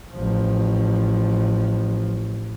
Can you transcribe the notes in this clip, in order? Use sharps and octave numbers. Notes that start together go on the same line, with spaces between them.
A1 F3